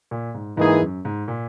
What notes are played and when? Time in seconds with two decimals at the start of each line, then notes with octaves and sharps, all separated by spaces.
0.11 A#2
0.35 G#2
0.57 G#2 E3 A#3 D#4 G#4
0.81 F#2
1.05 G#2
1.28 A#2